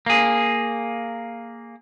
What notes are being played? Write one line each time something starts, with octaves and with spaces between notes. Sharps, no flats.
A#3 G#4